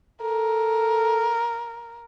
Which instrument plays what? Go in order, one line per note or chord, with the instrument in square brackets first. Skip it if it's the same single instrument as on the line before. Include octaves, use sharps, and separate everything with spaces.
[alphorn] A4 [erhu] A#4